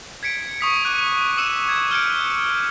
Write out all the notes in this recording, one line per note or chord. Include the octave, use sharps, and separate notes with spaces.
G#6 B6 C#7 D7
C#6 D#6 B6
D6 F#6 D#7
D6 E6 C#7 E7
G#6
F6 G6 G#6 C#7 D7